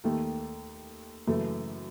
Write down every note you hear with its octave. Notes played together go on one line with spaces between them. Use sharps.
D#2 D#3 A3 A4
F#2 C#3 E3 A3 A4